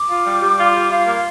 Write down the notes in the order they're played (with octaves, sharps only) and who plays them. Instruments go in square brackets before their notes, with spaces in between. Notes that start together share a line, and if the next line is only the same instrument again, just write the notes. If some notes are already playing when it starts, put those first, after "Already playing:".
Already playing: [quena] D6
[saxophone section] F4
G3
G3
F4
G3
F4
A#3